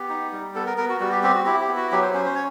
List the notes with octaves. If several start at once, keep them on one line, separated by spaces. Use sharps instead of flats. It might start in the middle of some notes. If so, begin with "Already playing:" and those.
Already playing: B3 G4
D#4
G3
B3 A4
A#4
B3 A#4
F#4
G3 F#4
G4
C4 G4
F#4
E4 G4
G4
B3
F#4
F#3 G4
C5
C#4 C5
C5
C#5